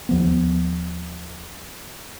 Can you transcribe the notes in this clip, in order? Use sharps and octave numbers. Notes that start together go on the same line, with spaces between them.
D#2 F3 B3